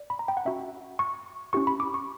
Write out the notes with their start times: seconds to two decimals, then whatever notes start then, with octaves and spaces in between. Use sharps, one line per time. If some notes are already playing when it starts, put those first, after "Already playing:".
Already playing: D5
0.10 B5
0.19 A#5
0.28 G5
0.37 F#5
0.45 C#4 F#4 E5
0.99 C#6
1.53 C#4 E4 G4 C#6
1.67 B5
1.80 D6
1.94 C#6